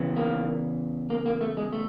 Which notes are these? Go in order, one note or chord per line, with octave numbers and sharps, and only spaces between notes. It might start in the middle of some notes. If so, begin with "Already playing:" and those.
Already playing: E2 C#3 E3
A#3
A#3
A#3
A3
G#3
A3